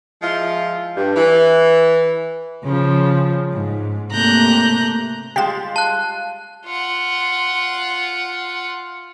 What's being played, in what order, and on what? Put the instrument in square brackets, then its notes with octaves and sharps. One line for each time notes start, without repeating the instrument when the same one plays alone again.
[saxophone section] F3 G#3 E4 F4
G2
E3
[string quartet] C#3 F3
G#2
C3 A3 A#3 A#5 F#6 G6
[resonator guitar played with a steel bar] G3 G#3 F4 [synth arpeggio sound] G4 E7 [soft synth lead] F5
[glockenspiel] A5 F#6
[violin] F4 F#5